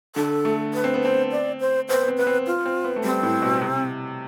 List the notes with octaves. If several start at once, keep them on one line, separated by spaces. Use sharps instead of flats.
D3 A4
A3
B4
C4
B3
C4 C5
D5
C5
B3 C5
B3
C4
B3 B4
C4
F4
C4
B3
A3
G3 C4
A2
B2
C3